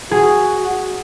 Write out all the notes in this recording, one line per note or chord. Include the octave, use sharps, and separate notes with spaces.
F#4 G#4